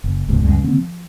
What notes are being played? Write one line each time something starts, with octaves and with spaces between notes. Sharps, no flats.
F#1
E1 C#2 G#2 B2
C#2 F#2 G3 G#3
D3 A#3 C4
F3